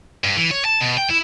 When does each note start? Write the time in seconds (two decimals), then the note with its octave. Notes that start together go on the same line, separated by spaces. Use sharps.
0.24 G2
0.37 E3
0.51 C#5
0.65 A5
0.81 B2
0.97 G5
1.10 E4